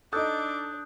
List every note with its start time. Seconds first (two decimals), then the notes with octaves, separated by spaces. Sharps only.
0.13 D4 D#4 A4 D6 D#6 F#6 G6